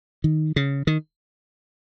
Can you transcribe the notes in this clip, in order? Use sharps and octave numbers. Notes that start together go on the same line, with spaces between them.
D#3
C#3
D#3